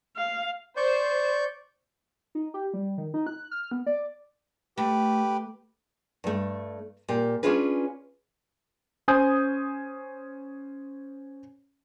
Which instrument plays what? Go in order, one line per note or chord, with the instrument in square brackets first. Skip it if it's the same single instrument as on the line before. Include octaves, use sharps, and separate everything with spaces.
[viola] F5
[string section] C5 [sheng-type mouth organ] D5 C#6 G6
[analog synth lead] D#4
G4
G3
D#3
D#4
F#6
F6
B3
D5
[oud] A3 [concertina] G4 B4
[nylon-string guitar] G2 A3
A#2 G4
C#4 D4 F4 G#4 B4
[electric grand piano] C#4 C5 G#5 D#6 G6